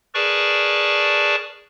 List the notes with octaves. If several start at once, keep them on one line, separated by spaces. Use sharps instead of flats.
G#4 A#4 B4 D5 A5 C#6